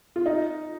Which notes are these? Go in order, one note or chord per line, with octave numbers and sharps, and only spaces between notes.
F4
D#4